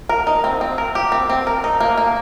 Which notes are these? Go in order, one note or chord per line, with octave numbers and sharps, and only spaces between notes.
A#4
D#4
C4
C4
A#4
G4
C4
C4
A#4
D#4
A#3
A#3